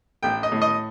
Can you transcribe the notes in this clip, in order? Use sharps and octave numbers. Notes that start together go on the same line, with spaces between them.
A1 G5
D#5
A2
D#5